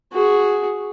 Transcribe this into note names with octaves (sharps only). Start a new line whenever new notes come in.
F#4 G#4